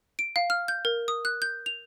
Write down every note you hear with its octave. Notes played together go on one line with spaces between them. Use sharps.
D7
F5
F6
G6
A#4
D#6
F#6
G6
F7